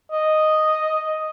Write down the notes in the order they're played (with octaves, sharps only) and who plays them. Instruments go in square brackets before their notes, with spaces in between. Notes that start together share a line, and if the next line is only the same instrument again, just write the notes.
[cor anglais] D#5